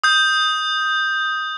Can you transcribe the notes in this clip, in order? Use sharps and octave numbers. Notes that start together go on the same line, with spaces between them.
D#6 G6